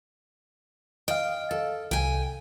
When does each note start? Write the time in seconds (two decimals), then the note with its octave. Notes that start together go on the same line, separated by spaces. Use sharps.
1.08 D#5 F5 G5
1.51 A4
1.91 C2 G5 G#5